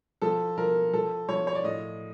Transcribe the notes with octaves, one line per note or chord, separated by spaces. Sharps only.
F3 A4
F3 A#4
F3 A4
F3 C#5
C#5
D5
A2 D#5